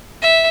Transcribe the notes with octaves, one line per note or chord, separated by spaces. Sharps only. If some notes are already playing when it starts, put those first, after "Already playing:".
E5